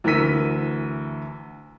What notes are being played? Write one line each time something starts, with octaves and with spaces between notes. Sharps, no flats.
D2 E3 A#4 E6 B6 D#7